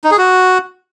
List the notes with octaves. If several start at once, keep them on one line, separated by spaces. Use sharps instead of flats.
D#4
G#4
F#4